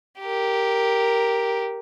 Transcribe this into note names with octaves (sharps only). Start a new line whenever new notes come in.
G4 A#4